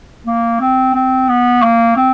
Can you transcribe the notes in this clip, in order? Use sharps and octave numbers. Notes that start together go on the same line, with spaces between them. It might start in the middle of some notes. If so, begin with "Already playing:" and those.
A#3
C4
C4
B3
A#3
C4